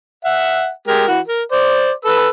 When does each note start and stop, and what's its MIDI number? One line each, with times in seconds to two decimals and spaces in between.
0.25 0.70 76
0.25 0.70 78
0.88 1.06 56
0.88 1.06 67
0.88 1.06 70
1.08 1.20 52
1.08 1.20 66
1.27 1.42 70
1.52 1.91 72
1.52 1.91 74
2.05 2.28 69
2.05 2.28 71
2.05 2.28 88